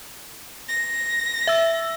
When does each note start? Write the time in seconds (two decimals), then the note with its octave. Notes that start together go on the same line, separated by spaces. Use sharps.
0.69 A#6
1.47 E5 E6